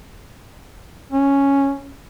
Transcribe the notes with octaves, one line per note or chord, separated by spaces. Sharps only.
C#4